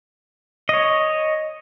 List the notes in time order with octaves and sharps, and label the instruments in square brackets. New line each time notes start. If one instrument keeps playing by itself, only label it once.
[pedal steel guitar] C#5 D#5